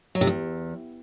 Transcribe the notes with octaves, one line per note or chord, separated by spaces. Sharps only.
F#3
C3
E2